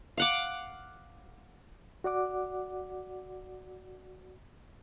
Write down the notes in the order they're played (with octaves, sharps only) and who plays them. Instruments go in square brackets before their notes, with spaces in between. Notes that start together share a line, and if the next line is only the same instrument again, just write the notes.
[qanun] F5 F#5 D6
[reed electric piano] F#4 D5 F#5 D6